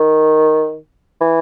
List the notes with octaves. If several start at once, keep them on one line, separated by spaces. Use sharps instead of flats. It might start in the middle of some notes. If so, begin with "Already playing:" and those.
Already playing: D#3
E3